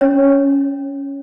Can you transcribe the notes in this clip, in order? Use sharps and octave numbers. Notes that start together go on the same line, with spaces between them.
C#4 C#5